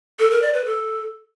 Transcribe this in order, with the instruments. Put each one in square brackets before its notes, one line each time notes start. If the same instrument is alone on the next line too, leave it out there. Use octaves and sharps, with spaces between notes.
[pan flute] A4
A#4
D5
B4
A4